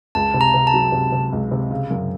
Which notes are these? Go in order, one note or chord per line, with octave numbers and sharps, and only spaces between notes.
C#2 A5
C3
A#5
C3
A5
F#3
C3
C3
C#2
C3
C#3
F#2